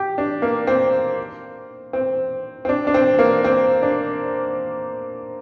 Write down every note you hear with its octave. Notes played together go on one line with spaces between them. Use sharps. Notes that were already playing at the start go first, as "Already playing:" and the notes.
Already playing: G4
D4
A#3
C4
C4
C4
D4
D4
C4
A#3
C4
D4